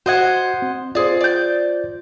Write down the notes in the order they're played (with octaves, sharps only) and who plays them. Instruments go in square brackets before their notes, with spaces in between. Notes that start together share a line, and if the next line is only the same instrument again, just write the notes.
[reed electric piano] F#4 G#6 [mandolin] C5 D#5 F#5
[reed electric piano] C4
[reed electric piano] F4 C5 [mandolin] G#4 D5
[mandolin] D5 G6